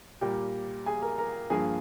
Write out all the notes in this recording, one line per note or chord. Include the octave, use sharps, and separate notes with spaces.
A#2 G3 A#3 G4 G5
G#4 G#5
A#4 A#5
A#4 A#5
G2 F3 A#3 G#4 G#5